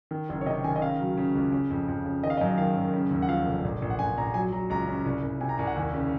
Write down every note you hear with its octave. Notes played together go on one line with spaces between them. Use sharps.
D#3
F#1
C#5
C3 D#5
D#3 G#5
D#5
C#3 F5
F#3
C#3
C#2
C#3
F2
F2
C#3
D#3 D#5
F5
D#5
F#2
D#3 F5
F#2
C#3
D#2
F#5
F3 F5
F1
A#1
A#1
F#5
A#1 G#5
A#1 A#5
F#3 G#5
F#3 A#5
C#2 A#5
C#3
C2
C2
C3 G#5
A#5
C2 G#5
F#5
D#2 G#5
C#3